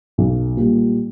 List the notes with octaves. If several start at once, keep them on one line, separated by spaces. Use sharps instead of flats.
B1
A#2 G3